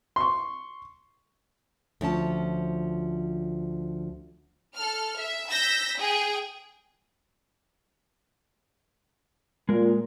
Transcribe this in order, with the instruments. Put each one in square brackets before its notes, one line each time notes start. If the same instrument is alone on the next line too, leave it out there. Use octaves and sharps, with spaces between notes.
[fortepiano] C6 C#6
[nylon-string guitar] D2 F3 C#4 A5
[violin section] A4 F6
E5
E6 G6 A#6 B6
G#4 G5
[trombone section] A#2 [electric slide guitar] G#3 A#4